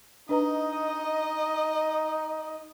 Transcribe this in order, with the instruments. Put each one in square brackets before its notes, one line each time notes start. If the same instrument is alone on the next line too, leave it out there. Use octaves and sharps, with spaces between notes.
[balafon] D4 B4 A#5 [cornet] D#4 [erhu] D#5